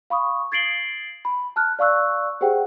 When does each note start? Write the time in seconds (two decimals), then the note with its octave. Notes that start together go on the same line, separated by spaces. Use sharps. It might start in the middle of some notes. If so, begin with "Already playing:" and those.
0.10 F5 B5 C#6 D#6
0.52 G#6 A6 C7 D7 F#7 G7
1.25 B5
1.56 A5 F6 F#6
1.79 D5 F5 C#6 E6 F#6
2.41 G4 G#4 C5 F#5 G5